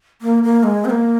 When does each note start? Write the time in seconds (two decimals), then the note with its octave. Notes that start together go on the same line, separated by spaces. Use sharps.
0.22 A#3
0.43 A#3
0.63 G#3
0.85 C4
0.90 A#3